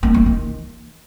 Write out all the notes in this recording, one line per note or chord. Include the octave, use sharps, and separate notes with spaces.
A#3
A3
D#3